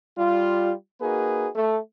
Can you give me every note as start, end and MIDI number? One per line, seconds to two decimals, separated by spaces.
0.18 0.72 55
0.18 0.72 65
1.01 1.48 58
1.01 1.48 63
1.01 1.48 66
1.01 1.48 68
1.01 1.48 71
1.55 1.77 57